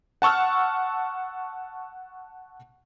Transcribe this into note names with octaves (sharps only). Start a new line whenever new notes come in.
F#5 A5 C#6 E6 F6